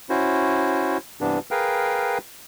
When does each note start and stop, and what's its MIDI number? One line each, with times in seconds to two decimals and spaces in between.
0.10 0.98 61
0.10 0.98 64
0.10 0.98 66
0.10 0.98 72
1.21 1.39 43
1.21 1.39 48
1.21 1.39 52
1.21 1.39 59
1.21 1.39 62
1.51 2.18 68
1.51 2.18 70
1.51 2.18 71
1.51 2.18 77
1.51 2.18 79